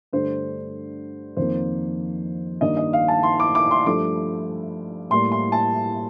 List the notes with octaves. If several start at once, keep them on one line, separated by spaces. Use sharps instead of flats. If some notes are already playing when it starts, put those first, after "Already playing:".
G2 D3 A3 C5
F2 D#3 A#3 C5
G2 D#3 A#3 D#5
D#5
F5
A5
C6
D6
D6
C6
G2 F3 A3 D6
A2 G3 A#3 C6
C6
A5